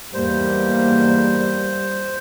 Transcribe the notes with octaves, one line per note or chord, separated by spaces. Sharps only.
E2 G#2 G3 A#3 C5